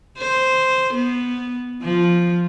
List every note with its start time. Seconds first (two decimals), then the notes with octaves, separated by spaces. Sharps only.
0.19 C5
0.94 B3
1.83 F3